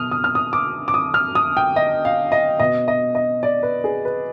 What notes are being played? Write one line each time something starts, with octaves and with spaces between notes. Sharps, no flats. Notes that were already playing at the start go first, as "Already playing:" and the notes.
Already playing: B2 B3 D#6 F6
D#6
F6
D#6
D6
D6
D#6
F6
D#6
G5
D#5
F5
D#5
B2 B3 D#5
D#5
D#5
D5
B4
G#4
B4